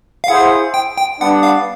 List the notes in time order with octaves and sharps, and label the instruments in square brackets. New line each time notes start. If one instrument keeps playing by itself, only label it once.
[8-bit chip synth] F5
[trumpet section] E4 G#4 C5 [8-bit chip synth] F#5
[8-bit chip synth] G5
G5
[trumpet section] G3 B3 D4 [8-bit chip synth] F#5
[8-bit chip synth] F5